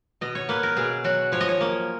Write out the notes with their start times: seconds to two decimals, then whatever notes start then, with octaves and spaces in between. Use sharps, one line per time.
0.21 B2 D#5
0.35 C#5
0.49 A#3 B4
0.63 A#4
0.77 B2 G#4
1.04 F#3 F#4
1.32 F3 C#5
1.41 D#5
1.49 C#5
1.61 A#3